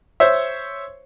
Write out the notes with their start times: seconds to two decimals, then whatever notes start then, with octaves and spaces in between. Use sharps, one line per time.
0.20 C5 C#5 E5